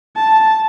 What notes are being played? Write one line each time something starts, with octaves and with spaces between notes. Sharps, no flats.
A5